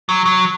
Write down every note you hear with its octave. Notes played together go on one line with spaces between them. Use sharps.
F#3
F#3